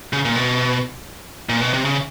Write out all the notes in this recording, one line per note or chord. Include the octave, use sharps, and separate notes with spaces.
C#3
A#2
B2
A#2
B2
C3
C#3